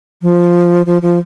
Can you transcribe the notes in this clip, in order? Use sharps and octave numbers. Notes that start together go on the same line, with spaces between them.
F3
F3
F3